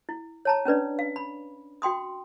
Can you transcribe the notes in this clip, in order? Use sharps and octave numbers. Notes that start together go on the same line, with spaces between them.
E4
C#5 A5 A#5
C#4 D4 B4 D5
F5
B5
F#4 G5 C6 D#6